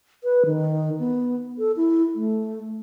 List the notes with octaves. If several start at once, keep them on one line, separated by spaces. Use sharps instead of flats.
B4
D#3
B3
A4
E4
A3